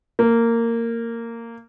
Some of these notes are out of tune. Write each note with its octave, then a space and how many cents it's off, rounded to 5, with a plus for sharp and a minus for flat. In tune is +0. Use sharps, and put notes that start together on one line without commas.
A#3 -15